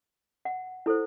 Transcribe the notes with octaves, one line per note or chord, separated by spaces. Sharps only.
F#5
E4 A4 C5